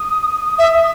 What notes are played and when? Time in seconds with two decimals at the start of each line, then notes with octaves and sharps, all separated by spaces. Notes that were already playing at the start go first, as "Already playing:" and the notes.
Already playing: D#6
0.59 E5